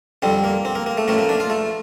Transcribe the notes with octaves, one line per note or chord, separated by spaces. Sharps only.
F2 D3 G3 C4
A#3
C4
A#3
A#3
A3
A1 A2 F3 A3 A#3
A#3
D4
F4
A3